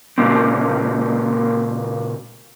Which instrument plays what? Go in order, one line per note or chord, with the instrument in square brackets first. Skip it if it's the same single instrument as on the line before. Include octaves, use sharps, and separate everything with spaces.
[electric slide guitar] A#2 C#3 A#3 C4